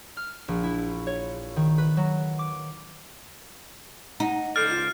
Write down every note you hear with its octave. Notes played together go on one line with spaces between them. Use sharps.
F6
A#1
E4
C#5
D#3
B4
F#3
D6
D#4 F#5
C#2 A4 C5 D5 F6
F4